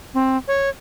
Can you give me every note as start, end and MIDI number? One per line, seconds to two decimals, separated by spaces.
0.14 0.37 60
0.48 0.69 73